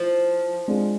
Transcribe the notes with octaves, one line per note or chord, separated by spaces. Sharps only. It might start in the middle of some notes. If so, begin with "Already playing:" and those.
Already playing: F3 E4
G#3 D4 F4 G#4